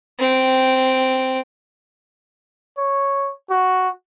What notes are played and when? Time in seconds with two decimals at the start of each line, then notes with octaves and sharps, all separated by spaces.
0.19 C4 G5
2.78 C#5
3.50 F#4